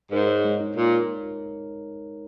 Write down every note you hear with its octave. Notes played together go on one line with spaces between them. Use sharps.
G#2 A#4
C#5
G#3
D#4
A#2 A#4
A#4